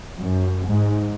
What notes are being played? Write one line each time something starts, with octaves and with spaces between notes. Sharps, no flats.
F#2
G#2